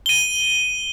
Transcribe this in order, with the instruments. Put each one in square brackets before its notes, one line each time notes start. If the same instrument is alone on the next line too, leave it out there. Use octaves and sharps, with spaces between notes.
[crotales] D#7 G7